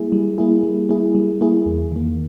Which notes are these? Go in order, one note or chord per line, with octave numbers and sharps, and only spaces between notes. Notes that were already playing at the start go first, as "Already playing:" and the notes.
Already playing: G3 A#3 E4 G#4
G3
A#3 E4 G#4
G3
A#3 E4 G#4
G3
A#3 E4 G#4
E2
D#3 A#3